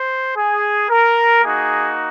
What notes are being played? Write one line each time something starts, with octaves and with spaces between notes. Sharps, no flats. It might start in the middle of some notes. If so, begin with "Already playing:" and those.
Already playing: C5
G#4
A#4
A#3 D#4 F#4 G#4